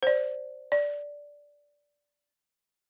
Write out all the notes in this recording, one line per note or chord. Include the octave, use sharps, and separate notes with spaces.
C5 D5
D5